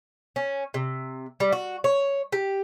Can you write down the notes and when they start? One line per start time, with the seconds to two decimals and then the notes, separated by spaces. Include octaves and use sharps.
0.36 C#4
0.74 C3
1.40 G3
1.52 F#4
1.84 C#5
2.32 G4